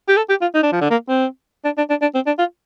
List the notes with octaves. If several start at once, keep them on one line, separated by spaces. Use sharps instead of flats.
G4
A4
G4
F4
D#4
D4
F3
D3
A#3
C4
D4
D4
D4
D4
C4
D4
F4